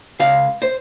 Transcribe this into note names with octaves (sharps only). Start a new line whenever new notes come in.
C#2 F5
C5